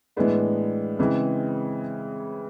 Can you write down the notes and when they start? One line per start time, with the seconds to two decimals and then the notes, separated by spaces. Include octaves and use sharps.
0.16 A2 E3 G#3 B3 D4
0.99 C#3 E3 G#3 C4